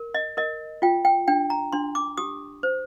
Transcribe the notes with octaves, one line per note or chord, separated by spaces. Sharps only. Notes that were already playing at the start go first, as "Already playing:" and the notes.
Already playing: A#4
D#5
A#4 D#5
F4 G5
G5
D4 G5
A#5
D4 C6
D6
G4 D#6
C5